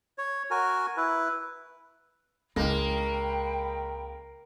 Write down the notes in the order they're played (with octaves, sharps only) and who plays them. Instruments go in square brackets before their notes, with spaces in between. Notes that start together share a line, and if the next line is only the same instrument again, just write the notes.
[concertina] C#5
F#4 A#4 G#5
E4 B4
[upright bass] C#2 E4 [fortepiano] C#3 G#3 [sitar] A#3 [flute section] G5 B5